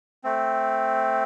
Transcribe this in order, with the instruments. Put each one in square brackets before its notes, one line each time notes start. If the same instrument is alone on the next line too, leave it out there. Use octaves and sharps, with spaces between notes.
[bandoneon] A3 C4